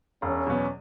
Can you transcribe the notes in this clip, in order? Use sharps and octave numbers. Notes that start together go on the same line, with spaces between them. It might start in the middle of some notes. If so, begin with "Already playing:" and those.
E1 C#4
E2 B2 F#3 B3